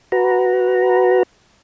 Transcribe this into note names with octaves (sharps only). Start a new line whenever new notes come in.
F#4 B4 A#5